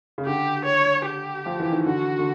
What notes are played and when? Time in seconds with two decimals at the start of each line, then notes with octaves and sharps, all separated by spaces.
0.18 C#3
0.25 D3 G4
0.65 C#5
1.06 G4
1.46 F3
1.60 E3
1.72 D#3
1.86 D3 F#4
2.19 D3